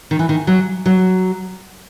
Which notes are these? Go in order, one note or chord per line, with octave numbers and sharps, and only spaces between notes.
D#3
E3
D#3
F#3
F#3